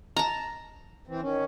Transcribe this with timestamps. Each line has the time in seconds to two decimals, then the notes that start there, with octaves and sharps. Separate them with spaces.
0.17 A5 A#5
1.07 E3 C4
1.21 D#3 C#4